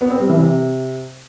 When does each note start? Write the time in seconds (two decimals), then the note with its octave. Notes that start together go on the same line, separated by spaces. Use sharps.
0.01 B3
0.10 C4
0.20 G3
0.29 E3
0.39 C3